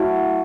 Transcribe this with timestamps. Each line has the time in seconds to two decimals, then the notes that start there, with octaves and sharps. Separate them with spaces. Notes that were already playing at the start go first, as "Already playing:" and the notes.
Already playing: F#3 A3 E4 F#4 F#5